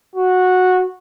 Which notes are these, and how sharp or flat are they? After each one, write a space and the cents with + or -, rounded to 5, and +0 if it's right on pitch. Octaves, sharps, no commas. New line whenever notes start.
F#4 -10